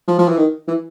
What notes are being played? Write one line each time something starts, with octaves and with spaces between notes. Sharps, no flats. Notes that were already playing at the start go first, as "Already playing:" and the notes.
F3
F3
E3
D#3
E3